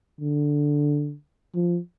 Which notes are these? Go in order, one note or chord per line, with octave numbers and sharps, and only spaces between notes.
D3
F3